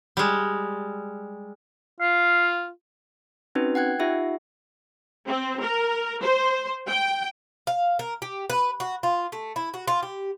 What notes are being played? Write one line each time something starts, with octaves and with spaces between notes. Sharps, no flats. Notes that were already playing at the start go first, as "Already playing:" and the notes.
G3 G#3
F4 F5
C4 C#4 D#4 F#4 B4
F#5 G5 F#6 G#6
D#4 F4 G4 E5 F#5
C4
A#4
C5
G5
F5
A#4
G4
B4
F#4
F4
A3
E4
F#4
F4
G4